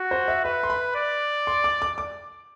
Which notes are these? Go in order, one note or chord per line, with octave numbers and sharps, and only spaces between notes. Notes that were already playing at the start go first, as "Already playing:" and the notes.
Already playing: F#4
C5
E5
B4 E5
C6
B5
D5
C6
D6
D6
D6